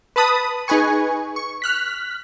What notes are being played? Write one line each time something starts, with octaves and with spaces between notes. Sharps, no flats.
B4 A5 B5 D#6
D#4 G#4 B4 G#5 C#6
C#6
F6 F#6 B6